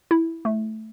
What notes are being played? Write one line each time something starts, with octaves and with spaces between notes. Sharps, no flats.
E4
A3